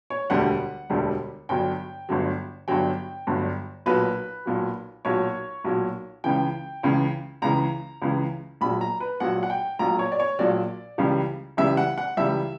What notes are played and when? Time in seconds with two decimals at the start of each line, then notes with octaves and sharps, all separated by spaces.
0.10 C#5
0.30 E1 D2 D3 G3 F#5
0.90 E1 D2 D3 G3
1.49 G1 G2 D3 F#3 G5
2.09 G1 G2 D3 F#3
2.68 G1 G2 D3 F#3 G5
3.27 G1 G2 D3 F#3
3.86 B1 A#2 F#3 B4
4.46 B1 A#2 F#3
5.05 B1 A#2 F#3 C#5
5.64 B1 A#2 F#3
6.24 C#2 C#3 E3 G5
6.83 C#2 C#3 E3
7.42 C#2 C#3 E3 A#5
8.02 C#2 C#3 E3
8.61 A#1 A#2 F#3 B5
8.81 A#5
9.00 B4
9.20 A#1 A#2 F#3 F#5
9.43 F#5
9.50 G5
9.79 A#1 A#2 F#3 A#5
9.99 C#5
10.12 D5
10.20 C#5
10.39 A#1 A#2 F#3 D5
10.98 C#2 C#3 E3 G3
11.57 C#2 C#3 E3 G3 E5
11.77 F#5
11.98 F#5
12.17 C#2 C#3 E3 G3 E5